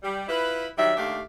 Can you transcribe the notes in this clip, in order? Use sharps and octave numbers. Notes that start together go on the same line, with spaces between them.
G3
E4 F4 B4
D#3 F#3 G3 E5
D#2 A3 D4 G4 F5